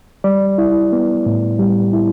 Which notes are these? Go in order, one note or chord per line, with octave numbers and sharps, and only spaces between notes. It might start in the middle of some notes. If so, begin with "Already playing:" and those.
G3 D5
E4
B3
A2
G3
E4